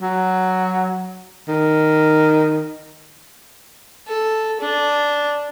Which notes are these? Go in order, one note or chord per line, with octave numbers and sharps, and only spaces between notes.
F#3
D#3
A4
D4